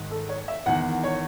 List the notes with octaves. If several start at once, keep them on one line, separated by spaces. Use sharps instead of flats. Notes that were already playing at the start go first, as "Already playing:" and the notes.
Already playing: G#2 D#3
A4
C#5
E5
E2 D#3 F#5
C#5